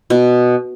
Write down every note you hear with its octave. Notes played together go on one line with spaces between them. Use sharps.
B2